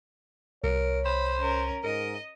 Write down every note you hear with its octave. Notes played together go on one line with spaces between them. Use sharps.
C2 A#4 C#5
C5 B5
C#4 A#4
G#2 A#4 D#5